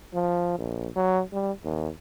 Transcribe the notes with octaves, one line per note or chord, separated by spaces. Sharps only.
F3
A#1
F#3
G3
D#2